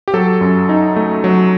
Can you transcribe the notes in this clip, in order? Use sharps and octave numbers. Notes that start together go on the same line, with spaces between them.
G4
F#3 A4
F#2
D#4
A3
F#3